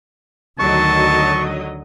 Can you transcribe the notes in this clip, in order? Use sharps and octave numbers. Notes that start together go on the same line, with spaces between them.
D2 D3 D#3 F#3 D#5 A5 C#6